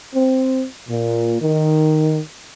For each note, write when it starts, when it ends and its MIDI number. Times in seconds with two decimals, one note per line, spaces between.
0.14 0.66 60
0.89 1.37 46
1.40 2.19 51